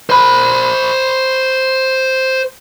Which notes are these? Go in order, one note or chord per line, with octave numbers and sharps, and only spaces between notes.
C5 B5